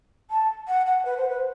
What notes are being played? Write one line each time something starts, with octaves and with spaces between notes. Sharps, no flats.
A5
F#5
F#5
B4
C5
B4